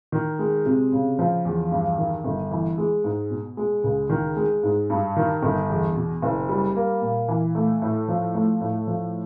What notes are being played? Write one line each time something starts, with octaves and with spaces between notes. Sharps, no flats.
D#3
G#3
C3
C#3
F3
E2
G2
D#3
G1
E3
G#3
G#2
B2
G#3
C#2
D#3
G#3
G#2
G2
D#3
G1
E2
B2
F#1
G3
A#3
A#2
E3
A3
A2
F3
A3
A2
F3